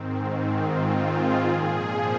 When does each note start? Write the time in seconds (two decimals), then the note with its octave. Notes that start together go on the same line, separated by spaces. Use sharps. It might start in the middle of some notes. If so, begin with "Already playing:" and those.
Already playing: G#2 D#3 C4
0.17 C4
0.59 F4
1.03 G#4
1.45 A#2 F3
1.87 C5